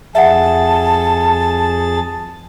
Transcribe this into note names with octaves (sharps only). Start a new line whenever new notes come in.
F2 G#4 E5 F#5 A5 A6